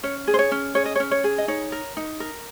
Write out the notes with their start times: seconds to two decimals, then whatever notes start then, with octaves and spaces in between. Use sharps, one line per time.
0.03 C#4 C#5
0.27 G#4
0.34 C5
0.39 C#5
0.52 C#4
0.75 G#4 C#5
0.85 D#5
0.95 C#5
1.00 C#4
1.11 C#5
1.24 G#4
1.38 D#5
1.48 D#4 C#5
1.72 A#4
1.97 D#4
2.20 A#4